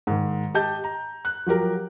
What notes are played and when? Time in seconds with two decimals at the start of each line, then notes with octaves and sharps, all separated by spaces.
0.07 G#2 D#3
0.54 G4 D#5 A5 G6
0.84 A#5
1.25 F#6
1.46 F3 F#3 G4 A#4